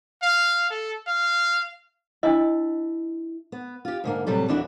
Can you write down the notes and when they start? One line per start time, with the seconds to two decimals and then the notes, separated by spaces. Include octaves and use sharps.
0.22 F5
0.70 A4
1.07 F5
2.23 D4 E4 D#5 A5
3.52 B3
3.85 F4 G4
4.04 G#2 D3 A#3
4.27 A2 C3 F#3 G3 A4
4.48 D#2 D3 E3 D4 E4 F#4